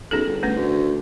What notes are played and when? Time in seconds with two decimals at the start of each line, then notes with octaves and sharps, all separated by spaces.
0.11 B1 C#4 G#4 A4
0.26 G1
0.43 A3 C#4 B4
0.57 D2